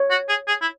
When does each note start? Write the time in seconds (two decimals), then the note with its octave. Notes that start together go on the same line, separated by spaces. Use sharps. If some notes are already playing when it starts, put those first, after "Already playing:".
Already playing: C#5
0.11 F#4
0.29 G#4
0.48 G#4
0.61 E4